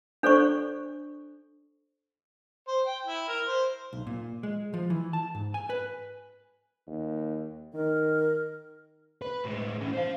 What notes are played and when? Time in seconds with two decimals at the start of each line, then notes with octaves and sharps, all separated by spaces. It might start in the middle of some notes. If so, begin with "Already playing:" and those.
0.23 D4 A4 C5 D5 C#6
2.68 C5
2.86 G5
3.07 E4
3.28 A#4
3.47 C5
3.93 B1
4.07 A#2
4.43 G#3
4.74 F3
4.90 E3
5.13 A5
5.35 G#2
5.54 G#5
5.70 B4
6.87 D#2
7.74 D#3 A#4
9.22 B4
9.45 A2 G#3
9.81 A2 C#4
9.93 C5 F5